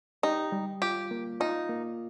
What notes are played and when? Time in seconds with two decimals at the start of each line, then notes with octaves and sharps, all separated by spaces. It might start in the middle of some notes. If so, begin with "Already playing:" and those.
0.23 D#4 G4
0.52 G3
0.82 F4 G4
1.11 A#3
1.40 D#4 F4
1.69 A#3